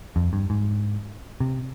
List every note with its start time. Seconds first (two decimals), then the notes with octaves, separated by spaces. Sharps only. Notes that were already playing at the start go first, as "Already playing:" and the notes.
0.16 F2
0.33 G2
0.50 G#2
1.40 C3